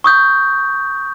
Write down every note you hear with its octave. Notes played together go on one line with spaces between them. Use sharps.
C#6 D#6 G6